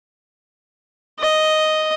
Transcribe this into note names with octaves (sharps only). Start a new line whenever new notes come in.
D#5